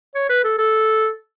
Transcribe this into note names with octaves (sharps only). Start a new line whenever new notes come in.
C#5
B4
A4
A4